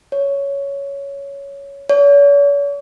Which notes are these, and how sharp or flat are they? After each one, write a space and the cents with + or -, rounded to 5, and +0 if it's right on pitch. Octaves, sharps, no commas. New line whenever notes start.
C#5 +10
C#5 +45